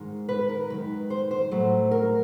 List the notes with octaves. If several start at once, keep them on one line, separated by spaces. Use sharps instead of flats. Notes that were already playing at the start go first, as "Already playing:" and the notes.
Already playing: G#2 D#3 G#3
B4
A#4
F#2 D#3 G#3 B4
C5
C5
A2 F#3 A3
A#4